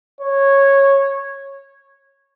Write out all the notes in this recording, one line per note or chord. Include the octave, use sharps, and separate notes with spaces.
C#5